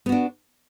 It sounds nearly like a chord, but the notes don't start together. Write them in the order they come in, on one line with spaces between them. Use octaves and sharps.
B3 F#4 D4